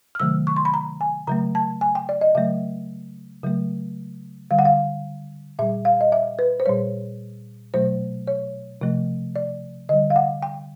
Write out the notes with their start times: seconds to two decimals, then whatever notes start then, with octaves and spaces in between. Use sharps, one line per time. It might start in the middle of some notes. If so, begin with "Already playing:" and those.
0.15 F6
0.20 C3 D#3 F#3 A3 E6
0.47 C#6
0.56 C6
0.65 B5
0.74 A#5
1.01 G#5
1.27 C#3 F#3 A3 A#5
1.55 A5
1.81 G#5
1.95 G5
2.09 D5
2.21 D#5
2.35 C#3 F#3 A3 E5
3.44 C#3 F#3 A3
4.51 D3 G3 F5
4.59 F#5
4.65 F5
5.59 A#2 G3 E5
5.85 F5
6.01 D#5
6.12 E5
6.39 B4
6.60 C5
6.66 A#2 G3 C#5
7.74 B2 F#3 A3 C5
8.27 C#5
8.81 C3 F3 A3
9.36 D5
9.89 D3 G3 D#5
10.10 F5
10.16 F#5
10.43 G5